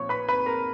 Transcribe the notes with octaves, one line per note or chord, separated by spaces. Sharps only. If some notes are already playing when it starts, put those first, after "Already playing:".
Already playing: A#2 F3 C#5 C#6
B4 B5
B4 B5
A#4 A#5